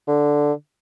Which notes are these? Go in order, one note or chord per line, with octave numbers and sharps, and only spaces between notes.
D3